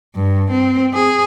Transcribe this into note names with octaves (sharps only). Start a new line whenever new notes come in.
G2
C4
G#4